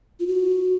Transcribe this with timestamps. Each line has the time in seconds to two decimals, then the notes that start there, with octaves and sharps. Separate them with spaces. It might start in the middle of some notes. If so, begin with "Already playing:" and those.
0.20 F4
0.27 F#4